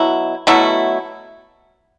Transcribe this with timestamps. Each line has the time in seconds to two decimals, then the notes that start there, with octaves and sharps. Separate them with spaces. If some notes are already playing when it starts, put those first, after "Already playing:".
Already playing: B2 F#3 E4
0.47 B2 F#3 A3 E4